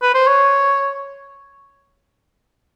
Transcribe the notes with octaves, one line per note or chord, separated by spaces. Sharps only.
B4
C5
C#5